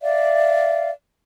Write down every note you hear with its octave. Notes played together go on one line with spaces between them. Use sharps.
D5 E5 F5